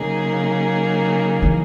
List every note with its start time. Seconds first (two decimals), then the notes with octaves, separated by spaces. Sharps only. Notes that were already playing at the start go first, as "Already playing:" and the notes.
Already playing: C#3 F#3 A#3 D#4 G#4
1.42 E3